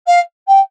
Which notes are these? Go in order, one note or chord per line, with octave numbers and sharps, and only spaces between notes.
F5
G5